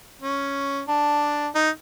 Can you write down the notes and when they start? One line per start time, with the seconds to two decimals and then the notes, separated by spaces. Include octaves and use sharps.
0.22 C#4
0.88 D4
1.55 D#4